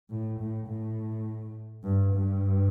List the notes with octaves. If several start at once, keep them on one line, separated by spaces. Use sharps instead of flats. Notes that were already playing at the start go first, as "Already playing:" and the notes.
A2
A2
A2
G2
G2